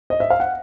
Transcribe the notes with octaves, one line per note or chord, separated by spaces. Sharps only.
D#5
E5
F5
F#5